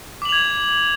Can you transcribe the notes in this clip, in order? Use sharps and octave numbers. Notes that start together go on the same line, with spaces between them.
D6 G#6 F7 F#7